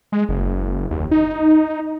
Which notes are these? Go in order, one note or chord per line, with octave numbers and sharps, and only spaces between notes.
G#3
F#1
D#2
D#4